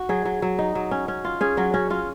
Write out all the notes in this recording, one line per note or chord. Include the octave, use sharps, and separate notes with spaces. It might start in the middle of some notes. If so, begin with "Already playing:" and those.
Already playing: F#4
F#3 G#4
F#3
F#3
D#4
F#3
C#4
C#4
F4
C#4 G#4
F#3 F#4
C#4 F#4
C#4 F4